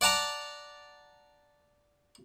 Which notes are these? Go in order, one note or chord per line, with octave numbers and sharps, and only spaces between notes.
D5 F#5 A5 A#5 D6